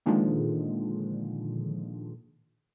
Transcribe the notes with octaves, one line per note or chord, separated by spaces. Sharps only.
A#2 D3 D#3 F3 G#3